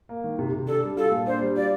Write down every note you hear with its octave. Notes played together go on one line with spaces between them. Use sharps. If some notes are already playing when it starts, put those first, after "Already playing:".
A#3
D#3
C3
C3
D4 A4
G3
F4 A4
A#2
D4 C5
G3
F4 D5